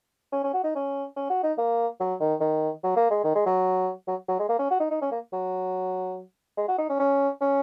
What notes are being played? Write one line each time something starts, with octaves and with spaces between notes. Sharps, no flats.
C#4
C#4
F#4
D#4
C#4
C#4
F#4
D#4
A#3
F#3
D#3
D#3
F#3
A#3
G#3
D#3
G#3
F#3
F#3
F#3
G#3
A#3
C#4
F#4
D#4
D#4
C#4
A#3
F#3
G#3
F#4
D#4
C#4
C#4
C#4